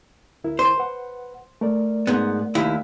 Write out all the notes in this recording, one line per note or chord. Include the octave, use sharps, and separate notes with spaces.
D2 E4 A#4
C5
B4 F#5
A3 A#4 D5
G#2 B3
D#2 E4